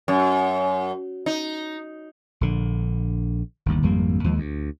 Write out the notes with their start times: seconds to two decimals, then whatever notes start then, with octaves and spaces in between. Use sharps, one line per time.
0.08 F#2
1.26 D#4
2.41 A#1 D3
3.66 G1 D#2
3.83 G#1 F2 G3 A#3
4.24 D#2 F3 G#3
4.38 D2